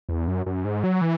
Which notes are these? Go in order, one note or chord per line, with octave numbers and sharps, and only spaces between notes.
E2
F#2
F#2
G#2
F#3
E3